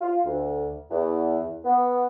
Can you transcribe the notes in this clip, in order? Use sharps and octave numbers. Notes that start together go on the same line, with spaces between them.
F4
D2
E2
B3